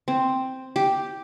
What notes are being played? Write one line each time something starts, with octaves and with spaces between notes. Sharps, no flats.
C4
G4